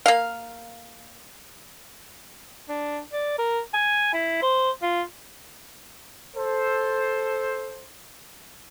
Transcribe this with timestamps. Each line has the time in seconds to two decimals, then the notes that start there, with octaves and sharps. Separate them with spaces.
0.06 A#3 F5
2.69 D4
3.13 D5
3.39 A#4
3.74 G#5
4.14 E4
4.42 C5
4.82 F4
6.36 A4 C5